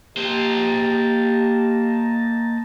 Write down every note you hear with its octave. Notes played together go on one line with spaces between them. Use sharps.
A#3 G4 C5 D#5 A5 A#5